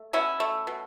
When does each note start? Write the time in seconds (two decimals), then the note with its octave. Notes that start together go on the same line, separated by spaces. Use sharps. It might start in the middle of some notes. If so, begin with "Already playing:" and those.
Already playing: A3
0.13 B2 C#4 E4
0.40 A3
0.67 B2